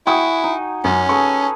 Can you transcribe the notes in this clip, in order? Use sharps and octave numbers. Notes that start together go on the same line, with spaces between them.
E4 F#4 G5 G#5 C#6 D#6
D#4
F#2 C#4
G#4 A4 B4 C#6